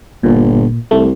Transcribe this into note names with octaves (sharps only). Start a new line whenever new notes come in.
G1 A#2
C2 A3